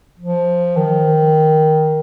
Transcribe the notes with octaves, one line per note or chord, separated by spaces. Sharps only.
F3
D#3